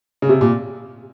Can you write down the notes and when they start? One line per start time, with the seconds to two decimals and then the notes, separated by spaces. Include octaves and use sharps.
0.22 C#3
0.29 C3
0.41 A#2